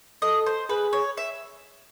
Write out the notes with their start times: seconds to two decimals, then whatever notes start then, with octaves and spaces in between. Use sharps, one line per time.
0.22 A4 D#5
0.46 C5
0.69 G#4 B4
0.93 C#5
1.17 E5